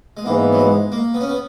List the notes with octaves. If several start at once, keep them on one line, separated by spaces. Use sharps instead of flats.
G#3
G#2 E3 A#3 B3
F#3
G#3
A#3
B3
C#4
B3